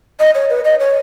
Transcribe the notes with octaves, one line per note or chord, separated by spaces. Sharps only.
D#5
C#5
B4
D#5
C#5